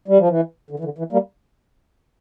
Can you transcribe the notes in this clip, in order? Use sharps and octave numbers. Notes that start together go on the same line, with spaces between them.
G3
F3
E3
D3
E3
D3
E3
G3 A#3